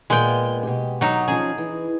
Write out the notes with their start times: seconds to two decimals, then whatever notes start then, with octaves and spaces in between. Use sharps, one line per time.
0.10 A#2 G#3 A#3 B3 G5
0.63 B2 G4
1.01 F#3 D#4
1.28 F3 C#4 G#4
1.58 E3